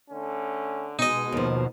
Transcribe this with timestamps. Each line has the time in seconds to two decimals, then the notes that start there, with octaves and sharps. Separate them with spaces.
0.11 D3 A3 C#4
0.99 B2 G#3 D#4 D#5
1.32 D#2 F3